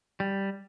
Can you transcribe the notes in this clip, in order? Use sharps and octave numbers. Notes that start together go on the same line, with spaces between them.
G3